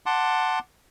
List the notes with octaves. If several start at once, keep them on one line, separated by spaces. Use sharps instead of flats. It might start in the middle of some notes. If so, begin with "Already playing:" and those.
F#5 A5 C6 D6